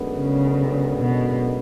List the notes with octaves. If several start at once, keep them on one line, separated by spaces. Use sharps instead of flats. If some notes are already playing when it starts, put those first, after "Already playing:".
Already playing: F#2 D3 G#3 B3
C#3
B2